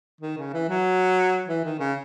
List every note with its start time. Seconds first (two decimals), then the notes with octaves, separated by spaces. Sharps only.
0.21 D#3
0.37 C#3
0.54 E3
0.69 F#3
1.48 E3
1.65 D#3
1.79 C#3